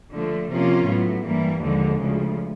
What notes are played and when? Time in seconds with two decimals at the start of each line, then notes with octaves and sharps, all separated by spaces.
0.11 D3 F3 A3
0.49 C3 F3 A#3 C#4 F4
0.86 A2 F#3 B3
1.24 G2 E3 G3 A#3
1.61 D#2 D3 F3 G#3
1.99 D2 C#3 F3